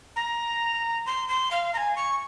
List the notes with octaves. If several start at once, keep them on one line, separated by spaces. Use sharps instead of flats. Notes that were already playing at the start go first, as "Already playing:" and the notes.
A#5
C6
C6
F5
A#5
G#5
C#6